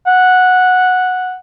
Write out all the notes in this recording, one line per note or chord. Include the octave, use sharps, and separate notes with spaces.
F#5